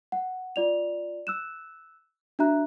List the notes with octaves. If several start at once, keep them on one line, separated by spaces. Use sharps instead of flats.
F#5
F4 D5 F7
E6 F#6 E7
D4 F#4 E5 A#5 F#6